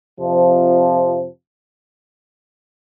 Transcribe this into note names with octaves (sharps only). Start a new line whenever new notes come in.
F2 C3 F3